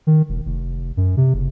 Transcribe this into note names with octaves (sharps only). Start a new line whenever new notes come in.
D#3
E1
F1
F#2
C3
F#1